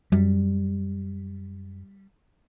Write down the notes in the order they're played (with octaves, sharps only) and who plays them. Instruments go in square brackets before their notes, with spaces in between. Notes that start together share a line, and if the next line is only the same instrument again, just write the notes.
[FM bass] F#2 [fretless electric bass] G3